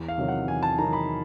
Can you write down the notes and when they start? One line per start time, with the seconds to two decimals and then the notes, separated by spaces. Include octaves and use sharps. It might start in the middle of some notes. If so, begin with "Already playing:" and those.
Already playing: E2
0.08 F5
0.18 C3 D#3 F#3
0.28 F#5
0.48 E2 G#5
0.63 A5
0.78 C3 D#3 F#3 A#5
0.93 B5